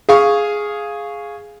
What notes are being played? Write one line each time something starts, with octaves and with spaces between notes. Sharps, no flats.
G#4 F5 G#5 C#6